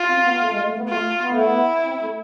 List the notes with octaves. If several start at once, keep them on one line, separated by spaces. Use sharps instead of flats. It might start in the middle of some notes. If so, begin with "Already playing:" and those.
Already playing: F4
C4
B3
A3
G#3
A3
B3
A3 F4
B3
A3
B3 E4
C4
A3